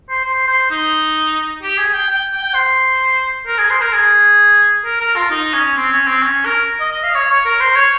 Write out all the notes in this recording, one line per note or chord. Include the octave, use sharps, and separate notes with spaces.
C5
C5
C5
D#4
G4
G#4
G5
G5
G5
G5
C5
A#4
G#4
C5
A#4
G#4
A#4
A#4
F4
D#4
C#4
C4
C#4
C4
C#4
A#4
D#5
D#5
F5
C#5
C#5
A#4
C5
C#5